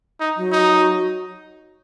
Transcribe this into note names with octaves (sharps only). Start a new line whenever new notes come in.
D#4
F#3
D#4